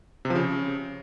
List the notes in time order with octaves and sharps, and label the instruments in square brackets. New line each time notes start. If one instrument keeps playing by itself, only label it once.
[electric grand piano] C3
F3
C#3